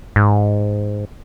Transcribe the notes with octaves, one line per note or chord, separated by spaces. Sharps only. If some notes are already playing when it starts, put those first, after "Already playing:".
G#2